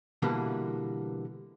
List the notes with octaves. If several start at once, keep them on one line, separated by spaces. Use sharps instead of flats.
B2 D3 E3 G3 A#3